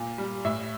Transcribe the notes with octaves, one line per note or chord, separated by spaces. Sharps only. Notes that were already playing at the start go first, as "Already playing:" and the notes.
Already playing: A#2
G3
A2 E5